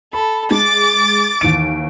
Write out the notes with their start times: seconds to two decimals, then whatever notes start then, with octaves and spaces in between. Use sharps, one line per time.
0.13 A4 B5
0.51 G#3 D6 A6
1.41 D#2 E3 D7